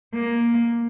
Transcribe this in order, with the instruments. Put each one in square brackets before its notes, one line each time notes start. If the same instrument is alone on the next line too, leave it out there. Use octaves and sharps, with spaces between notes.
[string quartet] A#3